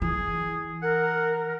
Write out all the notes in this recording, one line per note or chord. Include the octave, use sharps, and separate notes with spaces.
E3 G#4
A#4 F#5